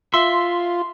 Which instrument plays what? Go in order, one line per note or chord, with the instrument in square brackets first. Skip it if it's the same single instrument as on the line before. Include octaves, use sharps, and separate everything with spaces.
[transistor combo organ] F4 [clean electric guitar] E5 [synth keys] C6